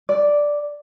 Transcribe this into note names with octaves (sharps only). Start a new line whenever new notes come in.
D5